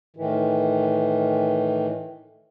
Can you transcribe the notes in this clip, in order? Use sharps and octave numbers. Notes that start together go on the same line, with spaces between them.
A2 D#3 E3